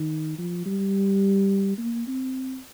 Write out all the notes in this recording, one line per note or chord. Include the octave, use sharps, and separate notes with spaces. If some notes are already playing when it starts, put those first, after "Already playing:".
Already playing: D#3
F3
G3
A#3
C4